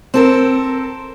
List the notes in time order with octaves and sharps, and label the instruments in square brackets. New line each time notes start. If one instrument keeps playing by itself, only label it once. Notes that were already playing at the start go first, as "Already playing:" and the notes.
[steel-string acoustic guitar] C4 A4 A#4